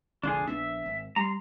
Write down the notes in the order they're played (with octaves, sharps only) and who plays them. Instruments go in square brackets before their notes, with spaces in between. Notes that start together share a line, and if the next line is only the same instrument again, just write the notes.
[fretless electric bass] F1 A#1 D3 [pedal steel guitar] D4 F4 G#4
[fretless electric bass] A#1 B3 D4 [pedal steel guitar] E5
[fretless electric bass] G#1
[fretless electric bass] G3 [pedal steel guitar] A#5 C6